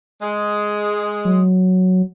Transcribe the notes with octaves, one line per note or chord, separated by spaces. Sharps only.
G#3
F#3